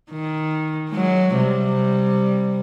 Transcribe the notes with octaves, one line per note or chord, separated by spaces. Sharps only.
D#3
F#3 G#3
C3 G3